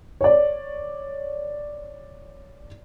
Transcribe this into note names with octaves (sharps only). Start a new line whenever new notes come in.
C#5 D5